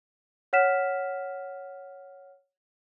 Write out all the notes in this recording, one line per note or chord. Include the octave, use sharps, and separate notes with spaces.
C#5 F#5 F6 B6 E7